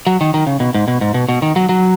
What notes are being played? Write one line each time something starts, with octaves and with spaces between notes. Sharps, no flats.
F#3
D#3
D#3
C#3
B2
G#2
B2
G#2
B2
B2
D#3
F#3
F#3